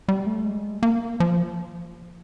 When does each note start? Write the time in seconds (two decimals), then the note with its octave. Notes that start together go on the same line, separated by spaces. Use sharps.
0.08 G3
0.27 A3
0.45 G#3
0.83 A#3
1.20 F3